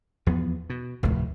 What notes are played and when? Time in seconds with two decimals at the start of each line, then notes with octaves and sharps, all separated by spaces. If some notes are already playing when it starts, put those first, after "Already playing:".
0.26 E2 F3 B3
0.70 B2
1.03 F1 D2 A2